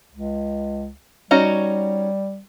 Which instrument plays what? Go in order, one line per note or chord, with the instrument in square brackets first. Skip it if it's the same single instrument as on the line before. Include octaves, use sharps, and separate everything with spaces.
[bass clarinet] C#2
[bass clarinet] G3 [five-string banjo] C#4 D#4 F#4